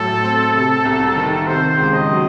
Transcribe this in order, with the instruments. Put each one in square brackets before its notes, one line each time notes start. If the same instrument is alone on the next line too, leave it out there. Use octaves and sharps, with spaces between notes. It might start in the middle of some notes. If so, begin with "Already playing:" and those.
Already playing: [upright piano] A2 F#3 [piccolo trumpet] A4
[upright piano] C4
C3
C2
D#3
[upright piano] C3 [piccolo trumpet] C5
[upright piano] C#2
[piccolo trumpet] D#5
[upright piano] F#3